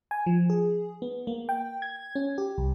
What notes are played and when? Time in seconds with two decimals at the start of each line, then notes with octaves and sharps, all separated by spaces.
0.11 G#5
0.26 F3
0.50 G#4
1.02 B3
1.27 A#3
1.49 G5
1.82 G#6
2.15 C#4
2.38 G4
2.58 C2